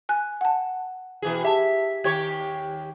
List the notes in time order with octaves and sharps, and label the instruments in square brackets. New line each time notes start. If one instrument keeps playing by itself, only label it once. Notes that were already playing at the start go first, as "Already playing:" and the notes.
[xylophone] G#5 F#6
F#5 A5
[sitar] B2 E3 G#4
[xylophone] G4 A5 [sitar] E5
[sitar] D#2 G4 C#5 [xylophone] G#6